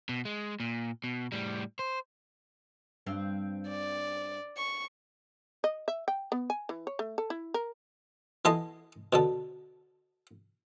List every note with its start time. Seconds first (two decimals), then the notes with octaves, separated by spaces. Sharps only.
0.09 B2
0.25 G#3
0.60 A#2
1.04 B2
1.32 A2 G3
1.79 C5
3.06 G2 C4 F5
3.69 D5
4.57 C#6
5.64 D#5
5.88 E5
6.08 G5
6.32 B3
6.50 G#5
6.69 E3
6.87 C#5
6.99 A3
7.18 A4
7.30 E4
7.54 A#4
8.45 E3 B3 A4 D#5 C6
9.13 B2 D3 A4